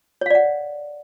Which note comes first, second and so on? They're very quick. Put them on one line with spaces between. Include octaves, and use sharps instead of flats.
C#5 F5 D5 F#5